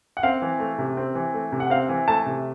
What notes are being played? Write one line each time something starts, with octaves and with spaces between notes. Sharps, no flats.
F#5
C4 F5
E3
A3
C3
C4
E3
A3
C3
F#5
C4 F5
E3
A3 A5
C3